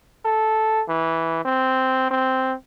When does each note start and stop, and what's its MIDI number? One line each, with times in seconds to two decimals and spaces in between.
0.25 0.82 69
0.88 1.43 52
1.45 2.10 60
2.11 2.54 60